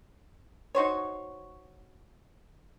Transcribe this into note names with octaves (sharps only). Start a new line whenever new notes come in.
D#4 F#4 C5 C#5